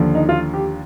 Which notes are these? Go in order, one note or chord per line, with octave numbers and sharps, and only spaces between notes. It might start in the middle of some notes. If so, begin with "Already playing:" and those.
Already playing: D#2 D3 F3
D#4
F4
G4